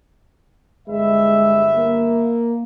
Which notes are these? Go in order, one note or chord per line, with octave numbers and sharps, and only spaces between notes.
G1 G#3 B4 E5
A#3